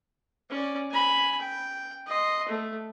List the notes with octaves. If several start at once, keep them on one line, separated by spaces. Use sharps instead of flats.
C#4 D5
G#5 B5
G5
D#5 C6
A3